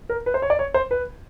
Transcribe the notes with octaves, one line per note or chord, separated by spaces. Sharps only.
A#4
B4
C5
C#5
D5
C#5
C5
B4